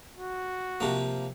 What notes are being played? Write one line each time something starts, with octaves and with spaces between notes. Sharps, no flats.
F#4
C3 F3 A#3